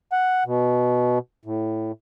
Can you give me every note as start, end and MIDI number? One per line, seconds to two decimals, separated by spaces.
0.12 0.44 78
0.46 1.19 47
1.45 1.92 45